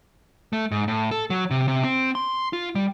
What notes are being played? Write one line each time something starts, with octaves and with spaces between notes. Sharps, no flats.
A3
G#2
A2
A4
F#3
C3
C3
C4
C6
F4
G3